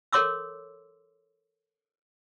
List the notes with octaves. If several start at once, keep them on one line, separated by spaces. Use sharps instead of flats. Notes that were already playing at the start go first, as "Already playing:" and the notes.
A4 A#4 C#5 C6 D6 E6